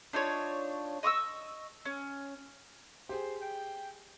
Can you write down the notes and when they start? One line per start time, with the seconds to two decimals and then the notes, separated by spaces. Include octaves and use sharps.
0.13 D4 D#4 F4 C#5
1.03 D#5 C#6 D#6 E6
1.85 C#4
3.09 G4 G#4 C5
3.41 G5